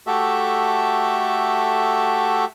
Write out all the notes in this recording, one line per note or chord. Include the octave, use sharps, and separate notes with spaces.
A3 F#4 G4 A4 E5